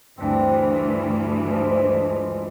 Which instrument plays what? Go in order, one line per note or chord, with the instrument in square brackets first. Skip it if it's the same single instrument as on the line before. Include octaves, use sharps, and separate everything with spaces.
[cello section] D2 G2 E3 [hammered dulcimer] C4 D4
[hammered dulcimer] G#2 F3 G#3